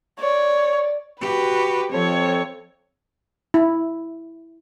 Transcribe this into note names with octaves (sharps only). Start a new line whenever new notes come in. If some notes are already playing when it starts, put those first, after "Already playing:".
C#5 D5
F#4 G4 B4
F2 F3 C4 A4 C#5
E4